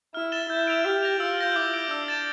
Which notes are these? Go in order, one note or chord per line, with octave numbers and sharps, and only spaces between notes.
E4 F6
A6 E7 G7
E4 G6
D7 F7
G4 F6
A#6 F7
F4 E6
G6 A#6 D7 G7
E4 D6
G6 D7
D4 E6
A6 E7